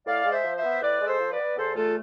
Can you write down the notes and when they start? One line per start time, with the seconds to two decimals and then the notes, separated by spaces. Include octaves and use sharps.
0.06 A2 D5 F5
0.25 G#3
0.32 C5 E5
0.44 F3
0.57 C5 E5
0.64 B3
0.82 A2 B4 D5
1.00 G#3
1.07 A4 C5
1.19 F3
1.32 B4 D5
1.39 B3
1.57 E2 A4 C5
1.76 A3 F4 A4